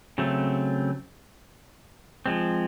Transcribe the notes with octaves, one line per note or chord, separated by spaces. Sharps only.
C#3 F#3 A3 C4
F3 G#3 C4